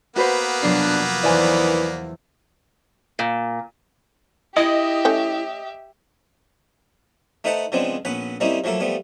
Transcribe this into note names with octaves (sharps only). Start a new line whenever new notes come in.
A#3 B3 F#4 B4 C5
F1 B2 F#3 D4 C7
E2 D#3 E3 C5 D5 G#5 E7
A#2
E4 G4 D#5 E5
A3 C#4 G5
A3 D#4 B4 C5 F#5 A5
C#3 F3 G#3 B3 C4 D4
A#1 B3 C#4 B4
G3 A#3 C4 C#4 D#4 E4
F3 F#3 A3 A#3 A4
F3 G3 A3 B3